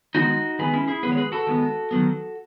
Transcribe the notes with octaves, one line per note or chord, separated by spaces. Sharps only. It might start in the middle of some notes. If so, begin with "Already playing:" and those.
D#3 G#3 B3 D#4 F#4
D#3 G#3 B3 G#4 B4
C#4 E4
E4 G#4
D#3 G#3 B3 G#4 B4
C#5
G#4 B4
F#4 A4
D#3 G#3 B3
D#3 F#3 B3